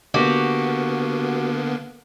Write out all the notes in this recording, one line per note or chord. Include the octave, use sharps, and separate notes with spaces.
D3 A#3 B3 F#4 G4